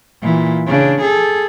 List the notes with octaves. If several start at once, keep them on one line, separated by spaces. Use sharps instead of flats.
A#2 E3
C#3 D4
G#4 A4